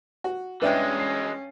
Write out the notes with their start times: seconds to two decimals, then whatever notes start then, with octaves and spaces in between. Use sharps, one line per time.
0.24 F#4
0.62 G2 E3 G#3 C#4 B4 D5 E5 G5
1.00 C7